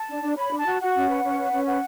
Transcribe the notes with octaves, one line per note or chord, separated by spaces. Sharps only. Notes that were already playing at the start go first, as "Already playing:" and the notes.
Already playing: A5
D4
D4
C#5 B5
D4
A5
F#4
F#4 F#5
C#4
B4
C#4
B4
C#4
B4 F#5